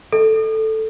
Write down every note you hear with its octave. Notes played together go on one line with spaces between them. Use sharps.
A4